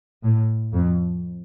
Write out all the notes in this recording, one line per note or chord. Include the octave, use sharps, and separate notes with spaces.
A2
F2